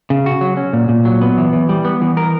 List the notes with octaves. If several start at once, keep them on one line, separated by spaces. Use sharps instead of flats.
C#3
F#4
F#3
C#4
A#2
A#2
F#3
B3
E3
E3
G3
B3
E3
A#4